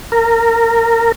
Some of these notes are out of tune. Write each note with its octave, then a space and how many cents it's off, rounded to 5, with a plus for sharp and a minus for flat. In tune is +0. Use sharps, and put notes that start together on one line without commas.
A#4 -20